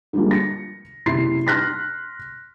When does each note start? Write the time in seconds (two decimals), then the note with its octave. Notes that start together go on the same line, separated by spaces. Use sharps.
0.13 D3 F3 G3 G#3 A#3
0.31 A#6 C#7
1.06 F#1 C3 E4 C6 C7
1.47 C6 F6 F#6 A#6 B6